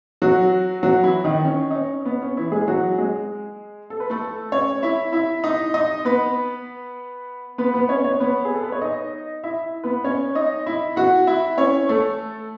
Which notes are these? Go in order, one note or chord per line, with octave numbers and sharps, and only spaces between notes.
F#3 F#4
F#3 F#4
E3 E4
D#3 D#4
C#4
D#4
C#4
B3
C#4
E3 E4
G#3 G#4
F#3 F#4
G#3 G#4
A4
B4
A3 A4
C#4 C#5
E4 E5
E4 E5
D#4 D#5
D#4 D#5
B3 B4
B3 B4
B3 B4
C#4 C#5
C#4 C#5
B3 B4
G#4
A4
B4
C#5
D#4 D#5
E4 E5
B3 B4
C#4 C#5
D#4 D#5
E4 E5
F#4 F#5
E4 E5
C#4 C#5
A3 A4